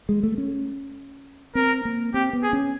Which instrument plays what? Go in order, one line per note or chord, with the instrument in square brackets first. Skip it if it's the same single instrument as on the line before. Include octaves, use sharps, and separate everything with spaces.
[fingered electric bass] G#3
A3
C#4
[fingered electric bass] C4 [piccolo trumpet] A#4
[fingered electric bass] A#3
[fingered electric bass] C4 [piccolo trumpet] G4
[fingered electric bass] B3
[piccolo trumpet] G#4
[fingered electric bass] C#4